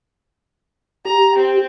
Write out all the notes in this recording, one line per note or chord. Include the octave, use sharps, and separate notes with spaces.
G4 A#5
C4